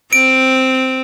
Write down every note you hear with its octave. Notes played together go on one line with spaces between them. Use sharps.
C4 D7